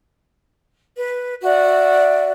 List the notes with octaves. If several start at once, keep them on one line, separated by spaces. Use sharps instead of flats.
B4
F#4 D5 E5